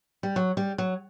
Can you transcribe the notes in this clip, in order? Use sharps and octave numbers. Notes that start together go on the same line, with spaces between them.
G3
F#3
G3
F#3